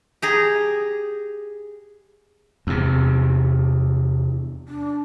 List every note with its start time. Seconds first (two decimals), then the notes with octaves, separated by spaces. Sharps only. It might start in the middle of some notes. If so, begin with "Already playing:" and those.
0.22 G4 G#4 A#5
2.67 E2 C3
4.68 D4